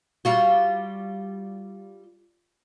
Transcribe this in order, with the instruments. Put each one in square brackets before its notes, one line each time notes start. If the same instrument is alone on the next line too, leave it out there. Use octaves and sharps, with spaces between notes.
[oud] G3 F4 F#4